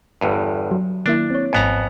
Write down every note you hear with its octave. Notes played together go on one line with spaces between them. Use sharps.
G1 E2 G2
F#3
D#3 A#3 D4 E4
C4 C#5
G#1 F2 G#2 B3 G#5 A#5